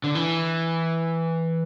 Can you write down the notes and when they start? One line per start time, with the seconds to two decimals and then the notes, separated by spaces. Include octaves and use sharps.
0.04 D3
0.15 E3